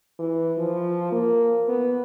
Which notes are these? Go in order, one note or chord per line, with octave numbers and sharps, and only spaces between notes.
E3
F3
A#3
B3